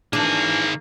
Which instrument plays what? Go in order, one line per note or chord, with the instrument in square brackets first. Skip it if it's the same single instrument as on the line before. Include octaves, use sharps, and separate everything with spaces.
[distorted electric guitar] D#3 G#4 [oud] E3 D4 [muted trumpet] A#3